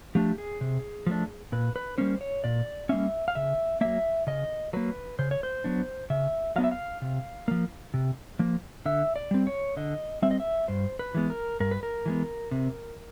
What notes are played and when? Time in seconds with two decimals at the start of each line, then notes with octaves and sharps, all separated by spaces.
0.15 F3 A3 D4 G4
0.38 G#4
0.61 C3
1.06 F3 A3 D4
1.52 A#2 B4
1.76 B4
1.98 G3 A#3 C#4 C5
2.21 C#5
2.44 A#2 D5
2.89 G3 A#3 C#4 E5
3.28 F5
3.35 C#3 E5
3.81 F#3 A#3 E5
4.27 C#3 D#5
4.73 F#3 A#3 B4
5.19 C#3 C5
5.31 C#5
5.43 C5
5.64 F#3 B3 D4
6.10 C#3 E5
6.56 F#3 B3 D4 F5
6.64 E5
6.71 F5
7.02 C3
7.48 F3 A#3
7.94 C3
8.39 F3 A#3
8.86 D3 E5
9.16 D5
9.31 G3 C4
9.47 C#5
9.77 D3 D#5
10.22 G3 C4 E5
10.31 D#5
10.40 E5
10.68 G2 C5
10.99 B4
11.15 E3 G#3 B3
11.30 A#4
11.60 G2 A#4
11.71 B4
11.83 A#4
12.06 E3 G#3 B3
12.51 C3